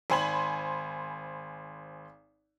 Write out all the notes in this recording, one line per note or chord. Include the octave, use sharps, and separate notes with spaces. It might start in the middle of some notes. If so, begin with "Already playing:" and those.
G#1 C5 G#5 B5 F#7